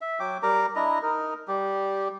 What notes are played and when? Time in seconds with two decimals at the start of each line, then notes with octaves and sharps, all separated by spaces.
0.01 E5
0.20 F#3 G5 D6
0.43 G3 A#4 A#5 D6
0.76 D4 E4 D#5 A#5
1.02 D#4 A#4
1.48 G3 G4